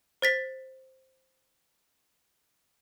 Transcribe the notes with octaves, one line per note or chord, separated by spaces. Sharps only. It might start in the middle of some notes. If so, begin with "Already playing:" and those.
C5 A6 B6